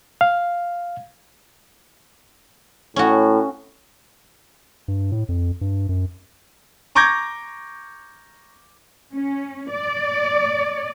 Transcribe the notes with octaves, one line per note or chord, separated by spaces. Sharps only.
F5
A2 C#4 F#4
G2
A2
F2
G2
F#2
A#5 C#6 D6 G6 G#6 A#6
C#4
D5